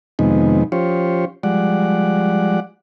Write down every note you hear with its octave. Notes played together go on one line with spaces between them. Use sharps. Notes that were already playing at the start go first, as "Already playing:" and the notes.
F2 C3 D#3 G#3 B3 D#4
F3 C#4 F4 G4 C5 C#5
F3 G3 G#3 D5 F#5